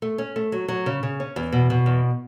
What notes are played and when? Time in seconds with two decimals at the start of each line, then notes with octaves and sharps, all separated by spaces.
0.02 A3
0.18 C#4
0.36 A3
0.52 F#3
0.68 F#3
0.86 C#3
1.03 C#3
1.20 C#4
1.36 E2
1.52 B2
1.70 B2
1.86 E2